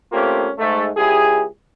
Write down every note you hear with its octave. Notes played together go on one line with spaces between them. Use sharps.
A3 A#3 C4 C#4 F4 G4
G#2 A3
C#2 E4 G4 G#4